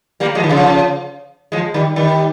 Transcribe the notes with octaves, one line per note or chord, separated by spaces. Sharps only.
G3 A#3
F3 G#3
D#3
C#3 F3
F3 G#3
D#3 G3
D#3 G3